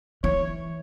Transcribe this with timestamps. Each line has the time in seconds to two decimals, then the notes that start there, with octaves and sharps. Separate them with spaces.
0.24 E3 C#5